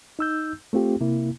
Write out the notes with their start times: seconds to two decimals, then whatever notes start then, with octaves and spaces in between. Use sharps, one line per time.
0.19 D#4 E6 G6
0.73 A3 C4 F4 G4
1.01 C3 A#3 E4